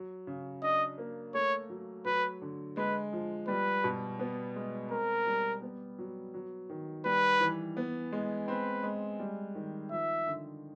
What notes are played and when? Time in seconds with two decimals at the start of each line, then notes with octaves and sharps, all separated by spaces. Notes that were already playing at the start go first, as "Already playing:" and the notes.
Already playing: F#3
0.27 C#3
0.62 D4 D#5
0.98 A#3
1.34 A3 C#5
1.70 F#3
2.05 F#3 B4
2.41 D3
2.77 G#3 B4
3.13 F3
3.48 G3 B4
3.84 B2
4.19 B3
4.56 G#3
4.91 C4 A#4
5.27 G3
5.62 B3
5.99 F#3
6.34 F#3
6.69 D#3
7.05 G3 B4
7.40 E3
7.77 B3
8.12 G#3
8.48 C4 B4
8.83 G#3
9.19 G3
9.55 D#3
9.91 F3 E5
10.26 D3